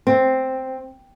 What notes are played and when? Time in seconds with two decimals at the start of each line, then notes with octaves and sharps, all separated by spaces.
0.07 C4